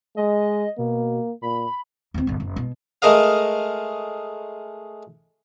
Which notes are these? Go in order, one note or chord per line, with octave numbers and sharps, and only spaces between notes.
G#3 D#5
B2 A#3
A#2 B5
D#2 C4
G1 D3
F#1
B2
G#3 A3 A#4 D#5 F5